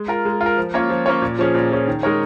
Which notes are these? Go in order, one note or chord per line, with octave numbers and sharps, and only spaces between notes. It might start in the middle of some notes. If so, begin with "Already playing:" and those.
Already playing: G#3
F4 A#4
G#3
F4
A#4
F3
A#3 C#4 F4 C#5
F3
A#3 C#4 F4 C#5
A#2
F3 C#4 G#4
A#2
F3 C#4 G#4
D#3
G#3 D#4 A#4 C#5